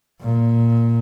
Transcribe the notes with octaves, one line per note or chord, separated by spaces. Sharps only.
A#2